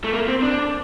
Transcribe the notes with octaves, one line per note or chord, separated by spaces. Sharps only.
A3
A#3
C4
D4